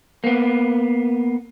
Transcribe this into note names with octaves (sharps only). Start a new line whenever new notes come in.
A#3 B3